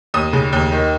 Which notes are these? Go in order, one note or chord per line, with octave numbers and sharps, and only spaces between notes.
D#2 D#6
C#3
D#2
D#3